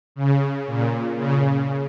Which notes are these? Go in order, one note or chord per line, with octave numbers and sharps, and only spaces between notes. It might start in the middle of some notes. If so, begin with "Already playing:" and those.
C#3
A#2
C#3